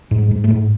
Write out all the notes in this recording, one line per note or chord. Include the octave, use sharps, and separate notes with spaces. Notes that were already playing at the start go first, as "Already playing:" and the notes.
G#2
G#3
G#2
A3
G#2